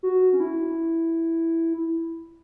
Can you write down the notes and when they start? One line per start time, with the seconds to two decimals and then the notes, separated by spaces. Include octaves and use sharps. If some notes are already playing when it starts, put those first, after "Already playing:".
0.03 F#4
0.33 C#4
0.40 E4